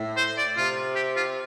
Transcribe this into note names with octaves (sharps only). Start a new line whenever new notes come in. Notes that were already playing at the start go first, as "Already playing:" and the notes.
Already playing: A2
C5
D5
C3 F4
G4
F4